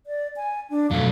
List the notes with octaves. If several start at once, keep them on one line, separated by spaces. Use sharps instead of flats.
D5
G#5
D4
F2 B2 F#3 A3 F5